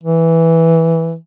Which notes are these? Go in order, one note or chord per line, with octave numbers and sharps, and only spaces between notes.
E3